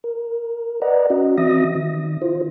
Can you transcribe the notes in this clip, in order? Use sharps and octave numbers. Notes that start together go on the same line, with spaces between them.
A#4
B4 D5 D#5 F#5 A#5
C#4 F#4 D#5
E3 C4 F#4 E5 D#6 A#6
D#3
E4 F4 C5